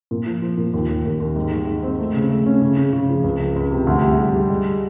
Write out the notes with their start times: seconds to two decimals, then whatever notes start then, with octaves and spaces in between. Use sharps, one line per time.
0.11 A#2
0.26 F3
0.42 F3
0.57 A#2
0.74 D#2
0.89 D#2
1.05 D#2
1.20 D#2
1.36 G#2
1.52 D#3
1.67 G#2
1.83 C4
1.99 A3
2.14 C#3
2.30 A3
2.46 C#4
2.61 C#3
2.77 C#3
2.93 C#3
3.09 F3
3.24 C#2
3.40 C#2
3.56 C#2
3.71 C3
3.87 D2
4.03 G3
4.19 G3
4.34 G3
4.50 G#3